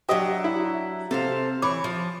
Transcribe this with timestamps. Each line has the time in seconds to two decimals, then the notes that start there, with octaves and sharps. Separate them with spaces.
0.09 F#3 D4 G4 D#5 E5
0.44 E4
1.11 C3 A4 C5 F5
1.62 E3 C#5 D6
1.84 F3